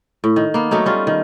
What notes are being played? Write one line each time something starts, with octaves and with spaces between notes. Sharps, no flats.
A2
D#3
A#3 B3
F#3 A3 C#4 D#4
G3 C#4 F4
D#3